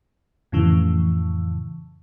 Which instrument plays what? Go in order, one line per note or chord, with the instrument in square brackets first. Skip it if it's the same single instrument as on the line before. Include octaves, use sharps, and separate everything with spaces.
[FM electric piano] F2 A2 C#3 E3